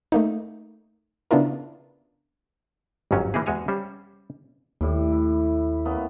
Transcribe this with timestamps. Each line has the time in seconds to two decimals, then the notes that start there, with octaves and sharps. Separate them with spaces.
0.12 A3 A#3 D#4
1.31 C#3 B3 D4 E4 F4 A#4
3.11 G1 F2 G#2 F#3 C#4
3.34 E3 A#3 D#4 E4 G#4
3.46 E2 G#3 F#4 G#5 A#5
3.68 G3 C#4 C5
4.81 D#2 A2 G3
5.12 E4
5.85 A#3 B3 C#4